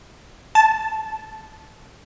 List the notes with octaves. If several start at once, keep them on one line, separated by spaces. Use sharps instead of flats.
A5